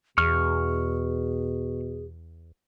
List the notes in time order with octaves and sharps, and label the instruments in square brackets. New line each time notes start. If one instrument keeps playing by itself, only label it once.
[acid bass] E2 [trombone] B2 [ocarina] G#4 [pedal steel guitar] C#6 F6